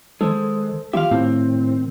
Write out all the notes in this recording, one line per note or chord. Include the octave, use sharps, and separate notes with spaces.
D#3 G#3 A4 C5
D#3 F4 G4 E5 F5
A2 C4